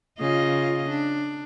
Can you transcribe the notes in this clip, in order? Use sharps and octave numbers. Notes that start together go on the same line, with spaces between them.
C#3 F4 D#5
D4